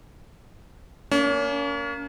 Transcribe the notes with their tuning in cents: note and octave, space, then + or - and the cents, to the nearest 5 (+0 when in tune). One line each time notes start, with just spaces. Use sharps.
A#3 -5 C#4 +35